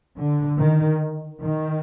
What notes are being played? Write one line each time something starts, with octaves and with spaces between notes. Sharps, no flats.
D3
D#3
D#3